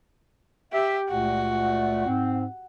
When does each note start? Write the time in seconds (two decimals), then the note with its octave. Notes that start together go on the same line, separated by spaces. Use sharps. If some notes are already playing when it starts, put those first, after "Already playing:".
0.73 G4 E5
1.09 C#2 A#2 A3 F#4
2.06 G#2 C4